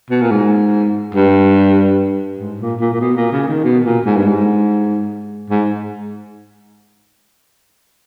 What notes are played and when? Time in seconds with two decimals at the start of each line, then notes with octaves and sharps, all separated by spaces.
0.10 B2
0.21 A#2
0.31 G#2
1.15 G2
2.39 G#2
2.60 A#2
2.80 A#2
2.93 A#2
3.01 B2
3.17 A#2
3.32 C#3
3.48 D#3
3.64 B2
3.85 A#2
4.06 G#2
4.16 G2
4.27 G#2
5.50 G#2